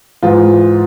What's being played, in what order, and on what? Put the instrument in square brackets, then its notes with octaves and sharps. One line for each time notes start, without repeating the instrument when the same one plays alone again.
[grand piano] G#2 E3 F4